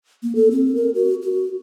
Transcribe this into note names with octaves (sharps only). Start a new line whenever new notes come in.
A#3
A4
C4
A#4
F#4
F#4